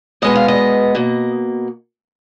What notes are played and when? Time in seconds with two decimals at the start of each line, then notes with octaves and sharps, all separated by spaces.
0.22 B2 G#3 B3 D#5
0.35 F5
0.48 D#5
0.95 B2 A#3